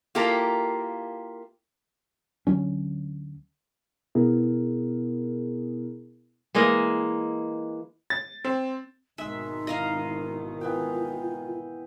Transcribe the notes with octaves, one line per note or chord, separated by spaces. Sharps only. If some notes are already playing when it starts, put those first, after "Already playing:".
A#3 E4 F4 G4 A4 A#4
D2 F#3 C#4
B2 B3 E4 G#4 A#4
E3 G#3 A#3 D#5
A6
C4
G#1 B2 D#3 G#3 D#4 E5
E4 D#5 F5 A#5
E3 B3 F4 G5